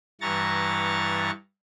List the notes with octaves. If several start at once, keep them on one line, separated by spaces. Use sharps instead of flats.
G2 E3 A#5 C#6 A6